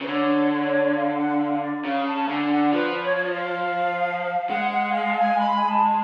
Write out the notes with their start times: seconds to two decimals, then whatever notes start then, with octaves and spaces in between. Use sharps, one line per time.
0.01 C#3 B4
0.07 D3 C#5
0.51 C#5
0.96 F5
1.17 F#5
1.40 F5
1.62 D5
1.75 D5
1.84 C#3 F5
2.06 A5
2.28 D3 G#5
2.50 F#5
2.72 F3 B4
3.02 C#5
3.15 C#5
3.23 D5
3.31 F5
4.49 G#3 F#5
4.72 F#5
4.93 F5
5.09 A5
5.16 G#5
5.38 B5
5.57 G#5
5.68 A5